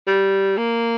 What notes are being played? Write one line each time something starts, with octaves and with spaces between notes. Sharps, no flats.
G3
A#3